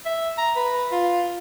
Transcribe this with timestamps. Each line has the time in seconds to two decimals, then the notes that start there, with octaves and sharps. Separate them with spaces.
0.05 E5
0.38 A#5
0.55 B4
0.91 F4